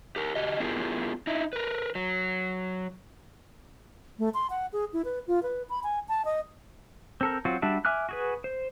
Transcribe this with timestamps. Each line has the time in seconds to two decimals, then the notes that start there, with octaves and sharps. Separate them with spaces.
0.16 G4 A#4
0.35 F#4 G4 D#5
0.60 B3 E4 F4 G4 G#4 A#4
1.27 D#4 E4
1.53 A#4 B4
1.95 F#3
4.19 A3
4.34 C6
4.50 F#5
4.73 G#4
4.93 E4
5.05 B4
5.27 F4
5.43 B4
5.70 B5
5.84 G#5
6.08 A5
6.25 D#5
7.21 C4 A4 A#4
7.45 F#3 C4 F4 F#4
7.62 G3 D4 F#4 E5 A5
7.85 E5 G#5 D6 F6 F#6
8.09 F#4 G#4 B4
8.44 C5